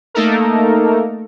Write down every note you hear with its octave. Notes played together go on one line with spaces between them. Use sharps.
A3 A#3 D#4 A4 A#4